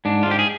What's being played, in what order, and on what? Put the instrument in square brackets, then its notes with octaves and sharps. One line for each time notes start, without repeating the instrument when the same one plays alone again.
[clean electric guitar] G#2 D4
F4
G#2 G4
G#4